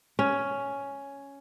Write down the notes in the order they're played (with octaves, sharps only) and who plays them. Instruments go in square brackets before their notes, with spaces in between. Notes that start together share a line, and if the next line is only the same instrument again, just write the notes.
[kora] C#4